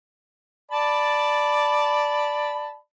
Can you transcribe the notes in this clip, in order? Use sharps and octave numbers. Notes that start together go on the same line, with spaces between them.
D5 A5 B5